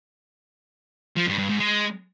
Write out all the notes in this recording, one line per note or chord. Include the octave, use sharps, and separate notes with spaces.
F3
G2
G2
G#2
G#3